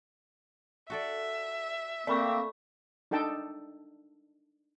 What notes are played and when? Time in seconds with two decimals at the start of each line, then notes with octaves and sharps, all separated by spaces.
0.90 F#4 A4 D5 E5
2.07 A3 A#3 C4 D5 B5 C#6
3.11 D4 D#4 A4 G5 A5